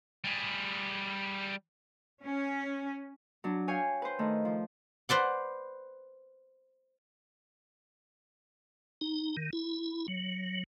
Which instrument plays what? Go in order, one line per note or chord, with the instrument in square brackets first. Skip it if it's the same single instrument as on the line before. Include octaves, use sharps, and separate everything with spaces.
[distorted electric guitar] G3 G#4
[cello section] C#4
[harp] F#3 D4
C#5 F5 G5 G#5
B4 C5
D#3 A3
F3
[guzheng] B4 C5 D5 F#5
[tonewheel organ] D#4
D#3
E4
F#3